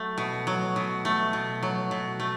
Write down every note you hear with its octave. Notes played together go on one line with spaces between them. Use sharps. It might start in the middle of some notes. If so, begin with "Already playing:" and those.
Already playing: F#3 A3
B2
F#3
B2
A3
B2
F#3
B2
A3